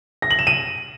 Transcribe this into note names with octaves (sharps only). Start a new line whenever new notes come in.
A#6
F#7
E7
D#7